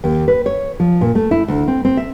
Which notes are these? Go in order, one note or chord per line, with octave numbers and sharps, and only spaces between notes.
D#2
B4
C#5
F3
A#2
A3
E4
D2
C4
C4
E5